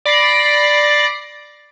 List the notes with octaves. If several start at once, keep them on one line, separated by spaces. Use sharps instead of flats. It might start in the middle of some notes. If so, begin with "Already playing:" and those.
D5 B5 A#6 C7 D7